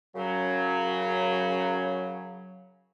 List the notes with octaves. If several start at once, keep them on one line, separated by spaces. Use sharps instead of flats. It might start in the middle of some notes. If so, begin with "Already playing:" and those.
F#2 C#3 F#3